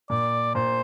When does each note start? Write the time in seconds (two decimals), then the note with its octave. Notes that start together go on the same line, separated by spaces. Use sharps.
0.10 A#2 D5
0.55 A#2 C5